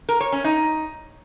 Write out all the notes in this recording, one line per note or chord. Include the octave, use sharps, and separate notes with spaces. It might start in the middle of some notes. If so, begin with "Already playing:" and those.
A#4
C#5
C#4
D#4